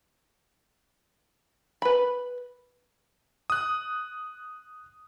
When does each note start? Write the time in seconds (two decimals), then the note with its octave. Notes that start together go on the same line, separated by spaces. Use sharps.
1.82 B4 B5
3.50 D#6 F#6